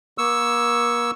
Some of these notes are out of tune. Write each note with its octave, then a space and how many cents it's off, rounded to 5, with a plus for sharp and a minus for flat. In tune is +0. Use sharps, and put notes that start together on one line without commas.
A#3 +40 C#6 +0 E6 +0